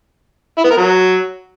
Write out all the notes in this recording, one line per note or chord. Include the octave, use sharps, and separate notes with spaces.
E4
B3
A#4
F#3